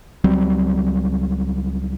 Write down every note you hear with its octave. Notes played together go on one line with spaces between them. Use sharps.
C#2 F#3 G3 C4